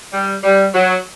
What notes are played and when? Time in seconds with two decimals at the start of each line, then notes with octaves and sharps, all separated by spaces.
0.13 G3
0.44 G3
0.74 F#3